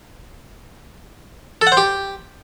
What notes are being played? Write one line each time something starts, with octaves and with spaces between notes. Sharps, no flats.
A4
F#5
C5
G4